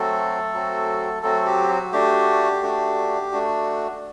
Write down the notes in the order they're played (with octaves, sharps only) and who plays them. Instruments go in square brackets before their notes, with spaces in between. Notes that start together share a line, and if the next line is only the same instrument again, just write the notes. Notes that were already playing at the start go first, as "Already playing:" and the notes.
Already playing: [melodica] F#3 A3 C4 F#4 A4
F#3 C4 F#4
F#3 A3 C4 F#4 A4
G4
F#4
A3 D4 F#4 G4
A3 D4 F#4
A3 D4 F#4